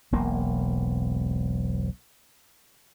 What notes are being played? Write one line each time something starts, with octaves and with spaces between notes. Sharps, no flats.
E1 B1 A#3